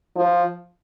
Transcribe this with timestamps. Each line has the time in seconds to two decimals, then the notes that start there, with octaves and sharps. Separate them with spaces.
0.16 F3